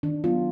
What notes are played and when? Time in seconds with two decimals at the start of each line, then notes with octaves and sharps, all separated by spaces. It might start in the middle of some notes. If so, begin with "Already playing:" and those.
0.03 D#3 D4
0.24 F#3 B3 F4